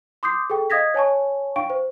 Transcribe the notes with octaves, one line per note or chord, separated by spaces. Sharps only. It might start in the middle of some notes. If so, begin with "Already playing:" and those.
C6 D6 D#6 G6 C7
G#4 A4 G5
D#5 F5 D#6 G#6 A#6 B6
C#5 G#5 A5 C#6
D4 F5 G5 C#6 D7
C5